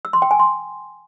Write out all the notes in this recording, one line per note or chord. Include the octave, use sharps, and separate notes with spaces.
E6
C6
G5
G#5
C6